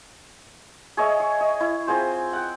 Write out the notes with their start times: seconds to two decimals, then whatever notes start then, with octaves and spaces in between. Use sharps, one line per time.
0.97 G#4 C#5 D#5 E5
1.20 C#5
1.41 D#5
1.60 E4
1.87 C4 F4 G#4 C5
2.33 F#5 G5